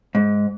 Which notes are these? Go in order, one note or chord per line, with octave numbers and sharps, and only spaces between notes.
G#2